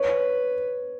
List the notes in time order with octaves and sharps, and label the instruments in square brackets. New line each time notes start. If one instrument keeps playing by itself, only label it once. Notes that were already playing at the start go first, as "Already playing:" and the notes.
Already playing: [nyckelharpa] B4 [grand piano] C#5